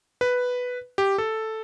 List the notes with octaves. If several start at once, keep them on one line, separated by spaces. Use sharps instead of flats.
B4
G4
A4